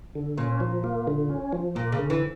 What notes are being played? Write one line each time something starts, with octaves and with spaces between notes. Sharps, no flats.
D3
A#2 C#4
F3
A#3
D3
C#4
F3
A#2 A#3
C#3
D3
E3